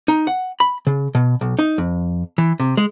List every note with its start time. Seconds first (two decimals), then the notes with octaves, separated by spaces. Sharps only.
0.08 D#4
0.27 F#5
0.60 B5
0.87 C#3
1.15 B2
1.41 B1
1.59 D#4
1.78 F2
2.38 E3
2.60 C3
2.77 G#3